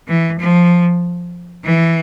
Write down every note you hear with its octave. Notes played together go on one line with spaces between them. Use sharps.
E3
F3
E3